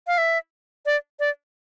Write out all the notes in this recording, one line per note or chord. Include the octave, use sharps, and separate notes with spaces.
F5
E5
D5
D5